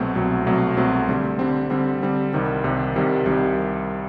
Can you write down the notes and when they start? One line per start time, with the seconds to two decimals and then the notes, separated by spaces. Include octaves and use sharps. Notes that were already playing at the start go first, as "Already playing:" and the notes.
Already playing: C2 B2 F#3 A3 C4
0.15 C2 B2 F#3 A3 C4
0.46 C2 B2 F#3 A3 C4
0.77 C2 B2 F#3 A3 C4
1.09 D3 G3 C4
1.39 D3 G3 C4
1.70 D3 G3 C4
2.02 D3 G3 C4
2.33 C2 C3 D#3 G3
2.64 C2 C3 D#3 G3
2.95 C2 C3 D#3 G3
3.26 C2 C3 D#3 G3